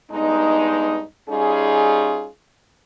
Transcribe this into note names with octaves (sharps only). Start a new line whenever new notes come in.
G2 G#3 B3 D#4
G3 C#4 D#4 F4 G#4